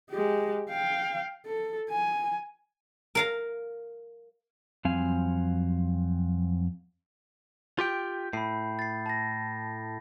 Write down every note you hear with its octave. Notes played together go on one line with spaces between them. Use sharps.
G#3 G4
F5 G5
A4
G#5
A#4 F5 A#5
F2 F#3 G3 C4 F5 G#5
F4 G4 G5 G6
A2 B5 C7
A6 C7
A5 A#6